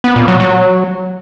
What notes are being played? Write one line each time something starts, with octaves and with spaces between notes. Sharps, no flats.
B3
A#2
F#3
F#3